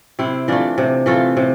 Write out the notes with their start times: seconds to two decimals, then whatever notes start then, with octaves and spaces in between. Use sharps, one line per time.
0.19 C3 C4 E4
0.48 E3 A3 D4 F4
0.78 C3
1.06 E3 A3 F4 A4
1.37 C3